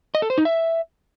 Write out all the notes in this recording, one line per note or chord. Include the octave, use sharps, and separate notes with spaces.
D#5
A4
C5
D#4
E5